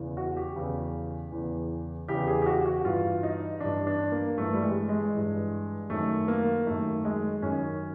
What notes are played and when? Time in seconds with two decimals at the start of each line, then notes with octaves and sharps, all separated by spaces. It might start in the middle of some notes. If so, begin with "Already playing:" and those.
Already playing: E2 C#3 E3
0.17 F#4
0.37 G4
0.56 E2 C#3 E3
1.32 E2 C#3 E3
2.08 E2 C#3 E3 G4
2.27 G#4
2.42 G4
2.46 F#4
2.66 F#4
2.85 G2 E3 F4
3.23 D#4
3.60 G2 E3 D4
3.87 D4
4.12 A#3
4.37 G2 E3 A3
4.54 G3
4.63 G#3
4.89 G#3
5.13 G2 E3
5.90 F#2 D#3 A3
6.28 A#3
6.66 F#2 D#3 A3
7.05 G#3
7.42 F#2 D#3 C#4